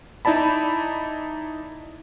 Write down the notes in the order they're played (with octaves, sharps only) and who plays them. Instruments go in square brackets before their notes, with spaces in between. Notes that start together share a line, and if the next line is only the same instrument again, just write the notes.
[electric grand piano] D#4 E4 D5 A5 B5